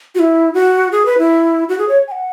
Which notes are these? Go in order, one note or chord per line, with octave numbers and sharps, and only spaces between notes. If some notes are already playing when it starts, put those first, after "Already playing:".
F#4
E4
F#4
G#4
B4
E4
F#4
G#4
C#5
G#5
F#5